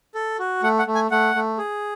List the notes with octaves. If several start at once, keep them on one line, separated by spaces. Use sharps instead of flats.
A4
F#4
A3 F#5
F#5
A3
G#5
A3 F#5
A3
G#4